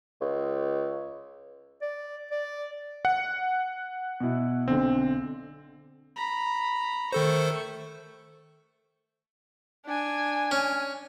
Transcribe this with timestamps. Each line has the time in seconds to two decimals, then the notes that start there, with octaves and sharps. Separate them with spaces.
0.21 C#2
1.82 D5
2.31 D5
3.05 F#5
4.20 B2 E4
4.68 B1 D3 C4
6.16 A#5 B5
7.12 D#3 A3 A4 C5 C#6
9.86 D4 G#5
10.51 C#4